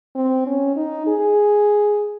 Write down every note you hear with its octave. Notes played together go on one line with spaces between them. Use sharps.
C4
C#4
D#4
G#4